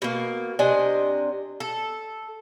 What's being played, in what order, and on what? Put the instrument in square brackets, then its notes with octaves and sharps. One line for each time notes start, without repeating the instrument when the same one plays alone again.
[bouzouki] B2 A#3
C3 D4 D#5 G#5
A4